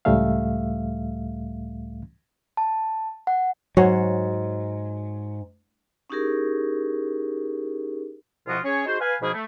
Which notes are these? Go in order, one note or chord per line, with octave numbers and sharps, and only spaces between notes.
C#2 A2 G3 A3 E5 F5
A5
F#5
G#2 F#3 F#4 C#5
C#4 D#4 E4 G4 G#4 A#4
C2 B2 F3 F4 F#4 D#6
C#4 G#4 C#5
D#4 F#4 G#4 C5
B4 F5 G#5
G#2 B2 F3 A#3 G#4 B5
A3